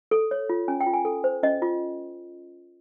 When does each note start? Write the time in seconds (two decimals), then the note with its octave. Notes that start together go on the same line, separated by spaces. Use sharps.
0.11 A4
0.31 C#5
0.49 F4
0.68 C#4 G#5
0.80 G5
0.86 F4
0.93 G#5
1.05 A4
1.24 C5
1.43 C#4 D#5
1.62 F4